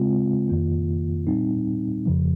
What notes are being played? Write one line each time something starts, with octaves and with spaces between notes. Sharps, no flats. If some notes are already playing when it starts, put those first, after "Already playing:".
Already playing: C#3 G#3 C4 F4
F2 D#3 A#3 F4
A#2 G3 C4 D#4
F2 C#3 F3